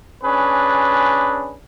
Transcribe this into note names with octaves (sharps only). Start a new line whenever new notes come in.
C#4 D4 G#4 B4